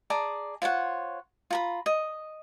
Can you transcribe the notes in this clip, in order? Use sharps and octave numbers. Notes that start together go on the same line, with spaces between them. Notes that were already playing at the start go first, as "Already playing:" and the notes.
G#4 D5 A5 A#5
F4 C5 C#5 F#5
F4 A#5 B5
D#5